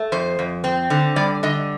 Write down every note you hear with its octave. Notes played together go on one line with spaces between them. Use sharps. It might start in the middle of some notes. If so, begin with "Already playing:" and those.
Already playing: A3
F2 C5
F2
C4
D3
G3 D5
D3 D#5